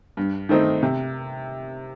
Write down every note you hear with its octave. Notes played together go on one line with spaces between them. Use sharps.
G2
D#3 A3 C4 D#4
C3